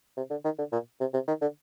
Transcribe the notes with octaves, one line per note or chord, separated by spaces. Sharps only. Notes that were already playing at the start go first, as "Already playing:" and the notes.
C3
D3
D#3
D3
A#2
C3
C3
D#3
D3